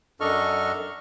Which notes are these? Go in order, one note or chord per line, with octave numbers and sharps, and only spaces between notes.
F#2 D4 A4 D#5 C#6 F6